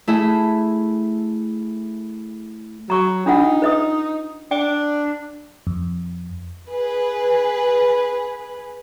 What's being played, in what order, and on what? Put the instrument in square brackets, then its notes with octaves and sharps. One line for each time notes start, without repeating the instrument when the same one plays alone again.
[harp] A3 E4 G#4 E5
[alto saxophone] F#3 [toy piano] A#5 C#6
[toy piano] D4 F4 F#5 [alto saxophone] D#4
[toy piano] B4 D#5 D#6
[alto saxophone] D4 [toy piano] G5
[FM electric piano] F2
[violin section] G#4 B4